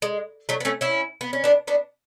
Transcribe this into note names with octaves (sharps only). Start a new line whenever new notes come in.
G#3
F#3 A3
B3
A3 C#4
C#4 E4
B3
C#4
B3 D4
B3 D4